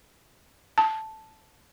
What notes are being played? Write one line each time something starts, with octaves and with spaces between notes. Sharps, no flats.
A5